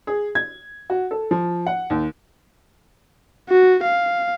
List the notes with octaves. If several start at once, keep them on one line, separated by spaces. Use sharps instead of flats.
G#4
G#6
F#4
A4
F3
F#5
D#2
F#4
F5